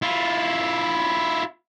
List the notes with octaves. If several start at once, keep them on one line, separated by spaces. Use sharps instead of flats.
E4 F4